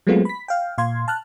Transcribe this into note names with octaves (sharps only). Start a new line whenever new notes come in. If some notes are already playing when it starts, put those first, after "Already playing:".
F#3 G#3 A3 B3 C4 F4
B5 B6
F5 G5
A#2 F5 C6 G#6
A5 F6 F#6